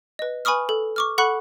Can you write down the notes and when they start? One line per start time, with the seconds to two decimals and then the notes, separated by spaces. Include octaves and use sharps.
0.19 B4 D#5
0.45 B4 G#5 B5 C#6 D#6 F6
0.69 A4
0.96 C#6 D6 F6
1.18 A4 F#5 B5 C#6 F#6